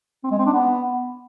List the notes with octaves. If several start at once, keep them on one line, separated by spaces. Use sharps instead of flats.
C4
G#3
C4
D4
B3